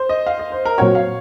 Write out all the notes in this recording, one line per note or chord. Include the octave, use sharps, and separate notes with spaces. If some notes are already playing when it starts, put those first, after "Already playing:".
Already playing: C5
D#5
F5
D#5
C5
A#4
A#2 F#3 C4 F#4 C#5
F5